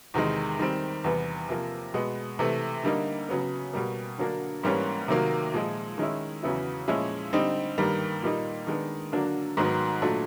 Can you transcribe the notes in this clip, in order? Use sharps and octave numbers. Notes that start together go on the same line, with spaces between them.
E2 C3 D#3 G#3
D#3 G3 C4
E2 C3 E3 G3 B3
C3 F3 A#3
B2 G#3 B3
C3 E3 A3
D3 G3 A#3 D#4
C#3 F#3 B3
B2 G3 A#3
D3 F#3 A#3 D4
G#2 E3 G3 A#3 C#4
C3 D#3 F#3 A#3
A#2 F3 G#3
D#3 G#3 C#4 E4
E2 C#3 F#3 B3 E4
A#2 F3 G#3 C#4 E4
D3 G3 C4 D#4
G2 D#3 G3 A#3
A#2 G3 A#3 D#4
D#3 G#3 B3 D4
D3 F#3 A#3 D4
G#2 D#3 F#3 B3
A#2 F#3 A3 D4